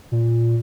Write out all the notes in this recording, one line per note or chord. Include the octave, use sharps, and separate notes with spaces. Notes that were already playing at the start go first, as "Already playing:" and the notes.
A#2